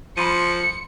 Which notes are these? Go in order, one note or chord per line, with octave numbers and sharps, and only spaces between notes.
F3 B5 C6 C#7 D#7